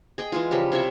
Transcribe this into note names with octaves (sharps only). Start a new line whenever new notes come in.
G#4 D#5 G5
E3 G#3 F4
C#3 F3 G3 G4
C3 E4 C#5 E5